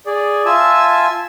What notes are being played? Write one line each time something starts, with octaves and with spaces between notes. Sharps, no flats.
G#4 D5
F4 E5 G#5 A5 E6